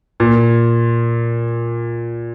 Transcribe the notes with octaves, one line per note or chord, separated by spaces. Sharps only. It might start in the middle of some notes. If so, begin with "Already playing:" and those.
A#2